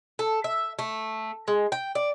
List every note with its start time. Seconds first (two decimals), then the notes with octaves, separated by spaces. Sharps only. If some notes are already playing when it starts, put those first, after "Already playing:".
0.19 A4
0.44 E5
0.79 A3
1.48 G#3
1.72 G5
1.95 D5